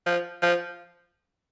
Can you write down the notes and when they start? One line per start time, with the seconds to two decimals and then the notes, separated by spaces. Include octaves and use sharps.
0.06 F3
0.42 F3